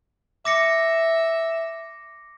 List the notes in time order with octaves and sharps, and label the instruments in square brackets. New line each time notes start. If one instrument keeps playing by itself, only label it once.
[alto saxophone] E5 [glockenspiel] D6 A#6 C#7